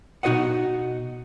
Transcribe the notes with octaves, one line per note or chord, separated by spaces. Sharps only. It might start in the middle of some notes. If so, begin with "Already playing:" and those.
B2 D#4 F#4 C5 D#5 F#5